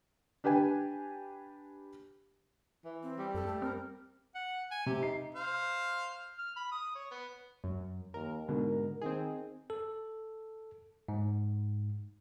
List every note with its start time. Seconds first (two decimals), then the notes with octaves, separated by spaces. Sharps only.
0.44 D4 G4 B4 G5 G#5
2.85 E3
3.03 C4
3.18 G3
3.35 F#2 A4
3.46 A3
3.62 C4 A#4
4.35 F#5
4.71 G#5
4.86 C3 G4
5.02 D#4 C7
5.35 C5 F5
6.39 F6
6.56 B5
6.72 D#6
6.95 C#5
7.11 B3
7.64 F#2
8.14 D#2 A#4
8.48 G#2 B2 D3 A#4
9.02 D#3 C4 G#4
9.70 A4
11.08 G#2